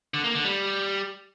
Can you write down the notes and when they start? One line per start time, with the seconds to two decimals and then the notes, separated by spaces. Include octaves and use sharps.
0.14 D3
0.24 A#3
0.34 D3
0.45 G3